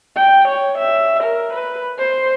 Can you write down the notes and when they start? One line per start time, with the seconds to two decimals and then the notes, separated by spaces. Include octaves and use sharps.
0.16 G5
0.48 C#5
0.78 E5
1.23 A#4
1.53 B4
1.98 C5